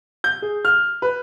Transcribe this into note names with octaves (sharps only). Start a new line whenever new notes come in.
G6
G#4
F6
B4